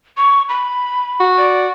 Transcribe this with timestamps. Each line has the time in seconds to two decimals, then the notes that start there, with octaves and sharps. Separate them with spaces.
0.17 C#6
0.49 B5
1.20 F#4
1.38 D5